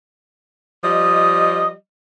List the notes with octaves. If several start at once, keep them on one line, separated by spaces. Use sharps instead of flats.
F3 G3 D#5 D#6